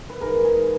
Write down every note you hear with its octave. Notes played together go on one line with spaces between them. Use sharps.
B4
G#2 E3 G#3 A#4
G#4